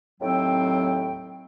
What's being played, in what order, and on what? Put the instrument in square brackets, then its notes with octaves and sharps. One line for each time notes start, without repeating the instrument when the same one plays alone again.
[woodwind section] D#2 A2 F#3 C4 G5